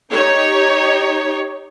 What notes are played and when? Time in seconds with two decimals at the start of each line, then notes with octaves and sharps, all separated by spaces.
0.11 D#4 G4 C#5